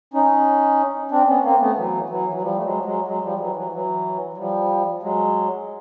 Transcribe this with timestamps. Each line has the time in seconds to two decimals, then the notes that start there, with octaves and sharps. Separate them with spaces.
0.14 C#4 D#4
1.11 C4 D4
1.28 B3 C#4
1.44 A#3 C4
1.60 A3 B3
1.76 E3 F#3
2.09 E3 F#3
2.33 F#3
2.42 F3 G3
2.57 A3
2.64 F#3 G#3
2.85 F#3 G#3
3.08 F#3 G#3
3.23 F3 G3
3.39 E3 F#3
3.56 E3 F#3
3.72 E3 F#3
4.33 F#3
4.37 F3 G3
5.02 F#3 G#3